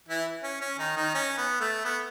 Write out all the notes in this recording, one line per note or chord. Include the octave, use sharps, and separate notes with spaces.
E3 E4
C#4
C#4
D#3 D#4
D#3 D#4
C#4
B3
A3
B3